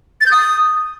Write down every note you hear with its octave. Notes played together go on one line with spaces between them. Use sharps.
A6
G6
D#6